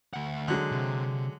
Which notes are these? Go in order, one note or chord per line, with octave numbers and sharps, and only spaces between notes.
D2 F#5
D3 F#3 G#3
C3